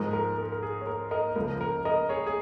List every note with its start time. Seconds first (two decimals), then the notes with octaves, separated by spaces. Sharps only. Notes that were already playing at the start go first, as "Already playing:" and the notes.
Already playing: G#2 F3 G#3 A#4
0.13 A#4
0.38 A#4
0.52 A#4
0.63 G#4
0.81 C#5
0.87 A#4
1.11 A#4 D#5
1.36 C#2 C#3 F3 A#4
1.61 A#4
1.85 A#4 D#5
2.09 G#4 C#5
2.27 G#4